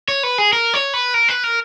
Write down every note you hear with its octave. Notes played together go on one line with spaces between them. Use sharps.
C#5
B4
G#4
A#4
C#5
B4
A#4
B4
A#4